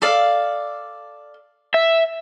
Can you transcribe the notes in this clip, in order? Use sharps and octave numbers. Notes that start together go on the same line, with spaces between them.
A4 D5 F5
E5